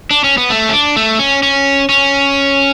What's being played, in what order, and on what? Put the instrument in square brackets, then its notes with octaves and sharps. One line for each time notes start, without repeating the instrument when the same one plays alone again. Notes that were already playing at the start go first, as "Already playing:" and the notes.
[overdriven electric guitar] D4
C#4
B3
A3
C#4
D4
A3
C#4
C#4
C#4